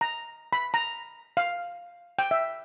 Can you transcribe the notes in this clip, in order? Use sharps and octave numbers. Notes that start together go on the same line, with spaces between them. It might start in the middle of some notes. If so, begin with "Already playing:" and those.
A#5
B5
A#5
F5
G5
E5